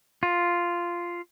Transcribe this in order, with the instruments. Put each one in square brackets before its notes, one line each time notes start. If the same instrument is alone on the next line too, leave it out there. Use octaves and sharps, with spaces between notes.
[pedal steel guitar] F4